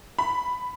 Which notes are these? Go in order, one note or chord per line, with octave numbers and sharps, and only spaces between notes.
B5